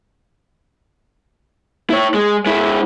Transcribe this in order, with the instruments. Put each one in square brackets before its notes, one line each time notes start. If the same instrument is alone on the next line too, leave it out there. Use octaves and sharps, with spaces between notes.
[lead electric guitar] E4 C#5
G#3
G#3 E4